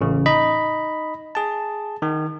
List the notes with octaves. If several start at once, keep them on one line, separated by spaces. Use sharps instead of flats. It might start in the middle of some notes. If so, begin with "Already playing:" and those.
A1 C#3
D#4 D#5 B5
G#4 A5
D#3